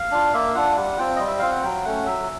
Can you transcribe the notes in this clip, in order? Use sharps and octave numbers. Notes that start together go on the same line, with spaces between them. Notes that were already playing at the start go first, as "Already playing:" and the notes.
Already playing: F5
D4 F4
A#3 E5
D4 F4 F#5
G3 F#5
C4 F4 G5
G3 D#5
E5
C4 F4 F5
F#5
F#3 G5
A3 C#4 F#5
F#3 E5